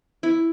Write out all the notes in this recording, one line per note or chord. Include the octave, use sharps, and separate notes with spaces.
E4